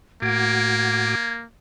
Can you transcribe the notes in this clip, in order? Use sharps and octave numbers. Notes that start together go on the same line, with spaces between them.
A2 A#3 F#4 D6 G#6